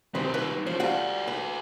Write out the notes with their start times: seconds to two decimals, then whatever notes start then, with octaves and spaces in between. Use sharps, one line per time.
0.15 C2 D#3 G3 C4 B4
0.34 B4
0.67 F3 C#4 C5
0.80 G3 F4 F#4 A4 F#5
1.28 B4